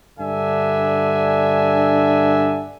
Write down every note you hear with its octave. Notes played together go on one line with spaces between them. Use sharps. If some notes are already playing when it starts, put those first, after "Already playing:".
G2 D3 D4 E5 G#5